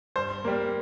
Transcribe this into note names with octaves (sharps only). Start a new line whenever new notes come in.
G2 C5
G3 A#3